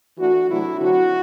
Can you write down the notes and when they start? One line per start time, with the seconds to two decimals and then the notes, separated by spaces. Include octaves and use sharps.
0.18 E3 A3 D4 F#4
0.50 C3 F#3 A3 D4 E4
0.80 D3 F#3 C4 F#4